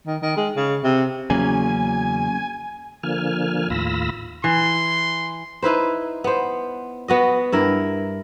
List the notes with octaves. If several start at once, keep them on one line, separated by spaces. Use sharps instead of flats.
D#3
D#3
G#3
C#3
C3
E2 C#3 F#3 A#3 C#4 G#5
D3 F3 A#3 G#5 F6
D#2 A2 F4 B5 E6 A#6
E3 C6
D#4 E4 B4 C5
B3 C5
B3 F#4 D#5
G2 E4 A#4